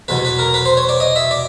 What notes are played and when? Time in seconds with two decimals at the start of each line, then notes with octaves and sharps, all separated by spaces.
0.08 E2 B2 F#3 B4
0.25 B4
0.39 A#4
0.54 B4
0.65 C5
0.77 C#5
0.89 D5
1.00 D#5
1.16 E5
1.31 D5